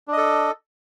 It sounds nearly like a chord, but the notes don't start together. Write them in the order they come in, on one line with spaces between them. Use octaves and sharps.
D4 D#5 A4